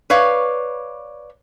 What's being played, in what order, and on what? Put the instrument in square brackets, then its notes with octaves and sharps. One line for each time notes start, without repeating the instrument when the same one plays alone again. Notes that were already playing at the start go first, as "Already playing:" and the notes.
[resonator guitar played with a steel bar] B4 C#5 D5 F5